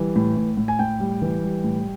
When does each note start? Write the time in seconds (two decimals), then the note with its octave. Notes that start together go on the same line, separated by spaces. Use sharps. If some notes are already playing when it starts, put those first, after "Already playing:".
Already playing: E3 G3
0.16 A2
0.37 A2
0.57 A2
0.68 G#5
0.79 A2 G5
1.00 G3
1.22 E3
1.44 G3
1.64 A2